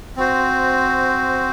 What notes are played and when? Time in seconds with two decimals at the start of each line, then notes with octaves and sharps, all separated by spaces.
0.17 C4 F#4 C5